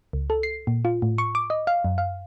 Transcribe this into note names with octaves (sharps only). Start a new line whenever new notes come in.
C#2
A4
C7
A#2
F4
A2
C#6
D6
D#5
F5
F#2
F5